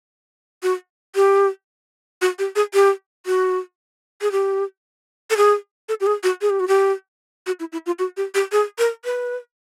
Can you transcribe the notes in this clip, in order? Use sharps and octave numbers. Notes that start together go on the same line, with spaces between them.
F#4
G4
F#4
G4
G#4
G4
F#4
G#4
G4
A4
G#4
A4
G4
G#4
F#4
G#4
G4
F#4
G4
F#4
E4
E4
F4
F#4
G4
G4
G#4
A#4
B4